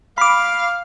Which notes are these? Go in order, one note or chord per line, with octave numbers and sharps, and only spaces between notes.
F5 B5 D6